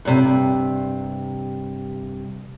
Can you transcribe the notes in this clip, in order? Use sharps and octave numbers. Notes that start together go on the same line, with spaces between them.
G2 C3